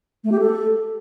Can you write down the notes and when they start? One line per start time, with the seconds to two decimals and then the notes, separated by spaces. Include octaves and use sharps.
0.24 A3
0.32 G4
0.40 A4